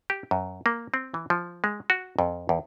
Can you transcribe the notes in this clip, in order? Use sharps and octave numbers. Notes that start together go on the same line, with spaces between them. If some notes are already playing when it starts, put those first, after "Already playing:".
G4
F#2
A#3
C4
E3
F3
G#3
F#4
F2
E2